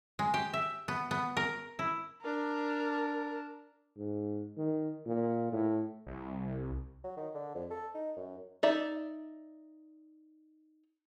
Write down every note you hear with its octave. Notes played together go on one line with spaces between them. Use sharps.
G#3
G4
E5
B3
B3
A#4
E4
D4 A#4
G#2
D#3
A#2
A2
C2
F#3
D#3
D3
F2
A4
D#4
F#2
D#4 D5 E5